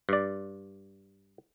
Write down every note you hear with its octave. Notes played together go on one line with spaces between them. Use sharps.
G2 D5